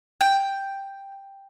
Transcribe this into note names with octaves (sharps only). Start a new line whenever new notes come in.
G5